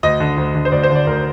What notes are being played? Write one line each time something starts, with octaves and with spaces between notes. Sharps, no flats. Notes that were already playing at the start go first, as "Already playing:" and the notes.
D2 D#5
D3
D2
D3
C5
D2 D5
C5
D3
D5
D2 A#4